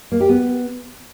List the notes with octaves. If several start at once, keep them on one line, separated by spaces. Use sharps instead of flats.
A#3
G4
B3